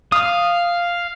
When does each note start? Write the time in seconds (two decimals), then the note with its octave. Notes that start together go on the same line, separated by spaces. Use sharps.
0.12 F5 D#6